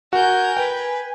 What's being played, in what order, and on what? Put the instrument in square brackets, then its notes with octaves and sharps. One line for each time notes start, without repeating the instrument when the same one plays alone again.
[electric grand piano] F#4 [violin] A#4 G6 [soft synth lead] G#5
[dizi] B4 [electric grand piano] G5